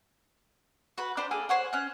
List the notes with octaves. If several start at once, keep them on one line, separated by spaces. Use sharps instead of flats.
F#4 B4 B5
D4 C5 G5 B5
A#3 G#4 A4
C5 C#5 F#5
C#4 F#6